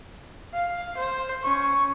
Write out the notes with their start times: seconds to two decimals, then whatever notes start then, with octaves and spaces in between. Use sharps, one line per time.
0.54 F5
0.97 C5
1.44 C#4 C#6